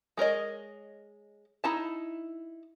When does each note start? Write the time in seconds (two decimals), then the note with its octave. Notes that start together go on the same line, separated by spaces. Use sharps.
0.17 G#3 A#4 C#5 D#5
1.64 D#4 E4 A5